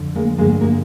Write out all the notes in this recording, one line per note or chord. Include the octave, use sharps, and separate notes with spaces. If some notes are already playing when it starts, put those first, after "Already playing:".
Already playing: F2 D3
G#3 A#3
G2 D3 G#3 A#3
G#3 A#3